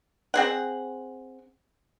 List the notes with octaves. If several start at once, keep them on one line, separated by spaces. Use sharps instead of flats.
C4 G#4 F#5